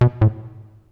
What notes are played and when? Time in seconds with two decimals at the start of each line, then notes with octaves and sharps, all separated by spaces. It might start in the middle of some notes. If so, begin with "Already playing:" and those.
0.01 B2
0.21 A2